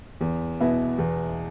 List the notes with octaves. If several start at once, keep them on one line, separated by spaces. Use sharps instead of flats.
E2
B2 B3 E4
E2